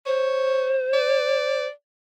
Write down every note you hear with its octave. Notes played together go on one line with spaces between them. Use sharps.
C5 C#5
D5